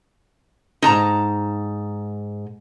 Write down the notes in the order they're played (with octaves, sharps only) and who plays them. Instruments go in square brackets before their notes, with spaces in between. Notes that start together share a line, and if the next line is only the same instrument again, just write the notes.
[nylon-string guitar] D#2 G#2 [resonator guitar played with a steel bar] D#4 A5 A#5